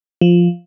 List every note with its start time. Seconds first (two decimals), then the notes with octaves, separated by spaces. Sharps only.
0.21 F3